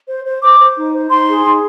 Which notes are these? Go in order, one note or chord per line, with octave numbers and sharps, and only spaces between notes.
C5
C5
C5 D6
C5
D#4
C5
D#4 C6
G#4
D#4